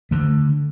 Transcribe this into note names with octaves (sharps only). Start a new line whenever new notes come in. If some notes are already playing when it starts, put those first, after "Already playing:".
D3 A3